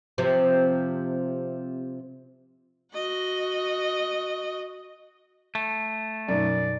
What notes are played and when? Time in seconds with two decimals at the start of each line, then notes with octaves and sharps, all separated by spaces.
0.18 C3 F3
2.94 F#4 D#5
5.55 A3
6.29 F#2 B2 D#4 D5